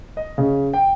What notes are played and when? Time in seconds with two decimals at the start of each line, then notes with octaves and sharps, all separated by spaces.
0.17 D#5
0.38 C#3
0.73 G5